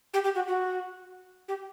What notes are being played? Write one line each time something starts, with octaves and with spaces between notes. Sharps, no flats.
G4
G4
F#4
F#4
G4